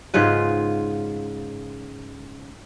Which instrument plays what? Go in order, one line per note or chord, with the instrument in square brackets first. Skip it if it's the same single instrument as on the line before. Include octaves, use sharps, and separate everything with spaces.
[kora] G#2 C#3 F4 B4